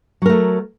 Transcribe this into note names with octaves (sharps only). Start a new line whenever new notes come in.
F#3 A3 A#4